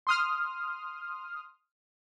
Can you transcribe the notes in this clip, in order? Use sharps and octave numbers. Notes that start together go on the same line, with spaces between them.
C6 D#6 F6